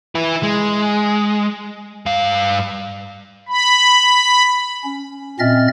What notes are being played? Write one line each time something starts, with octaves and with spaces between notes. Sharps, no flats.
E4 B4
G#3
G2 F5
B5
C#4
A#2 C4 D#5 E5 F6 A6